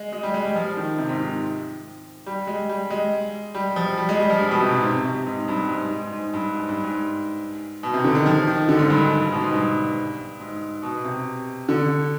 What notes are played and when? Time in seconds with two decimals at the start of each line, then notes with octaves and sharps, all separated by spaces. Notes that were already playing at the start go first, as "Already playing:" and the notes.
Already playing: G#3
0.12 G#3
0.23 G3
0.34 G#3
0.45 G3
0.55 F3
0.77 D#3
0.98 C3
1.09 G#2
1.20 G#2
2.26 G3
2.47 G#3
2.69 G3
2.90 G#3
3.55 G3
3.76 F3
3.98 G3
4.09 G#3
4.19 G3
4.30 F3
4.40 G2
4.51 B2
4.62 C3
4.72 G#2
4.83 C3
5.05 C3
5.27 G#2
5.48 G2
5.69 G#2
5.90 G#2
6.12 G#2
6.34 G2
6.55 G#2
6.69 G2
6.83 G#2
7.83 B2
7.94 C3
8.04 D3
8.15 D#3
8.26 F3
8.47 D#3
8.69 D3
8.79 G#2
8.90 G2
9.01 G#2
9.12 G2
9.22 G#2
9.33 B2
9.44 G#2
9.54 G2
10.40 G#2
10.83 B2
11.04 C3
11.69 D3